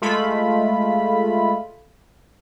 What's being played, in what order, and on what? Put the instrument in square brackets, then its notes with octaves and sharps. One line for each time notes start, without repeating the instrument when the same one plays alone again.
[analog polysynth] G#3 A3 F4 B5